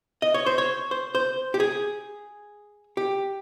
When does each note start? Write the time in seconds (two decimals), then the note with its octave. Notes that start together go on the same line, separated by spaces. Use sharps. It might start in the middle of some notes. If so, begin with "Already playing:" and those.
0.22 D#5
0.34 C#5
0.46 C5
0.58 C#5
0.91 C5
1.15 C5
1.54 G4
1.60 G#4
2.97 G4